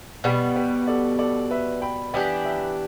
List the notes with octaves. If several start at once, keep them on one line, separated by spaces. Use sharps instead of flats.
B2 G3 B3 G5 B5
G4 B4
A4 D5
A4 D5
B4 E5
G5 B5
E3 B3 D4 G4 D5 G5
B4 E5